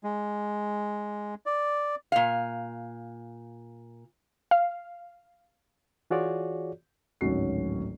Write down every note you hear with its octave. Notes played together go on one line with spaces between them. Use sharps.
G#3
D5
A#2 F5
F5
E3 F4 F#4 G#4 C#5 D5
D1 G#1 F#3 C#4 F#4 C7